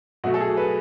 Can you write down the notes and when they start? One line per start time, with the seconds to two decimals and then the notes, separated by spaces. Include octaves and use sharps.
0.24 B2 F#3 A3 F#4
0.34 A4
0.40 G#4
0.57 B4